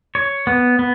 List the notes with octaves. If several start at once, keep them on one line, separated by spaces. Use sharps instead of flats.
C#5
B3
B3